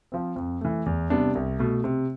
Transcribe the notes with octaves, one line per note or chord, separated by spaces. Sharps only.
F3 C4
F2
E3 A3
E2
C3 G3 B3 D4
C2
B2 A3
C3